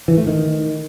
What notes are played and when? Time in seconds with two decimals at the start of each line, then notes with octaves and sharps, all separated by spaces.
0.08 E3
0.17 A3
0.27 D#3